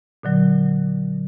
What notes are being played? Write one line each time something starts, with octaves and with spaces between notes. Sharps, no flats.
A#2 D3 F#3